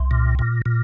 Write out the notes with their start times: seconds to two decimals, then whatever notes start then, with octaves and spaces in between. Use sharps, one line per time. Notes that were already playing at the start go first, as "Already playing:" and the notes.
Already playing: C2
0.11 A#2
0.39 A#2
0.66 A#2